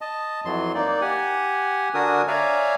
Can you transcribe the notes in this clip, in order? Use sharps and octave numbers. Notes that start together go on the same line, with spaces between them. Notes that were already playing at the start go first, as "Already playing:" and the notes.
D#5 A5
F2 E3 F#3 C6
A#3 D#4 D5
G4 F#5 G#5
D3 D4 F#4 A#4 G#5 D#6
C#5 D5 E5 F5 G#5 A#5